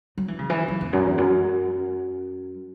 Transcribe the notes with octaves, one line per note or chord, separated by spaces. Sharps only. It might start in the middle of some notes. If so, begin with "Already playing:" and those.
F#3
E3
C#3
E3
F#3
E2
F#2
E2
F#2